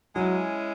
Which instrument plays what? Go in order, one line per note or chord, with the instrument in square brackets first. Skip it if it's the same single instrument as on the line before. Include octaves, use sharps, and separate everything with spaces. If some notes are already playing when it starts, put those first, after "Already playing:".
[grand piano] F#3 [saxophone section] G#3 C#4 E4